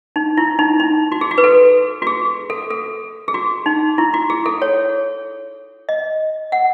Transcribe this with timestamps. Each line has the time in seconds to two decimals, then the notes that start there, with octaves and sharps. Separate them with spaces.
0.16 D#4
0.37 E4
0.59 D#4
0.80 D#4
1.12 F#4
1.21 G#4
1.31 F#4
1.38 B4
1.44 A4
2.02 F#4
2.07 G#4
2.50 A4
2.71 A4
3.28 G#4
3.34 F#4
3.66 D#4
3.98 E4
4.14 F#4
4.30 G#4
4.46 A4
4.62 C#5
5.89 D#5
6.52 F#5